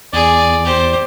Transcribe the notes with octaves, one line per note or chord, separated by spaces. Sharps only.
E2 G#4 D5
G4 C5